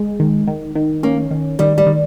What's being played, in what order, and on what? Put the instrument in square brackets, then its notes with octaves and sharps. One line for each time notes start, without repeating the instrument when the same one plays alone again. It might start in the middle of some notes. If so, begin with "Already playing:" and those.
Already playing: [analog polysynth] G#3
D#3
D#3
D#3
[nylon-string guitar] A#3 [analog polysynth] C#4
[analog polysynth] D#3
[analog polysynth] D#3 [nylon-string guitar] G3
[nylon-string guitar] G3
[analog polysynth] D#3